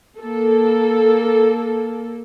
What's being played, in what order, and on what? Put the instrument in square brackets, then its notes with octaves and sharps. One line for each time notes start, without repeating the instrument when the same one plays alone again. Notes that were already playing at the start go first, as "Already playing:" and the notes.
[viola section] A#3 A4